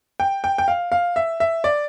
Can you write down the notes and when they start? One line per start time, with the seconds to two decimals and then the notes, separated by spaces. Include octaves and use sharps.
0.20 G5
0.44 G5
0.58 G5
0.68 F5
0.92 F5
1.16 E5
1.40 E5
1.64 D5